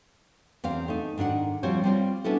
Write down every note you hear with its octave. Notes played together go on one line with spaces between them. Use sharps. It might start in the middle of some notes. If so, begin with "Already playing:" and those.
E2 C4 F5
A3 D#4
G#2 D#3 D4 F#5
F3 G3 C4 C5 C#5
G3 C4 F4
B3 C#4 D4 E4 A4